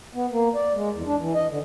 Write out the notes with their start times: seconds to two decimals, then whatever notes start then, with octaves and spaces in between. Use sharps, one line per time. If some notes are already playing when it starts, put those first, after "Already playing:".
0.15 B3
0.32 A#3
0.55 D5
0.75 G#3
0.94 E2
1.06 D4
1.19 E3
1.35 D#5
1.49 D3